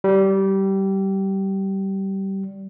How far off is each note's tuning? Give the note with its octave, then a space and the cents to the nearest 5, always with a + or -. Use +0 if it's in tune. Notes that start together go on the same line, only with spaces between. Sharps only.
G3 -20